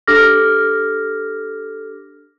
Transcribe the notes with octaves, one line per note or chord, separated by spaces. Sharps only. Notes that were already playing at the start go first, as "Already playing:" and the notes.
D4 G4 A4 D6 F6 A#6